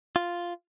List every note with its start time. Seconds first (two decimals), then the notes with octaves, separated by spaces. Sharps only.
0.16 F4